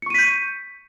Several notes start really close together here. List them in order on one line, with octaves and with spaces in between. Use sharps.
C#7 C#6 D#7 B6 G6